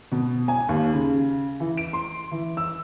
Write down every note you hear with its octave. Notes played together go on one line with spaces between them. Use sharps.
B2
G#5
D#2
C#3
E3
D7
C6
E3
E6